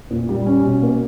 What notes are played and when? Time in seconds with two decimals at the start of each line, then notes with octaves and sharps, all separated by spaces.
0.11 A#2
0.29 G3
0.46 C#4
0.63 B2
0.82 A#3